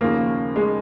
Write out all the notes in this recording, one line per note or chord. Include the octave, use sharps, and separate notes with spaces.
D#2 C#3 F3 A#3
G#3